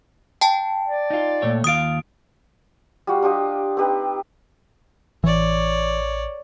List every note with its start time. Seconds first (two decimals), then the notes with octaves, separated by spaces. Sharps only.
0.41 G5 A5
0.87 D5
1.10 D#4 F4
1.42 A#2 A3 C#5
1.64 D#2 F4 F5 D#6 D7
3.07 G3 F4 F#4
3.23 D4 F4 G4 D#5
3.77 C4 D#4 G4 B4
5.24 A1 E3 C#5 D5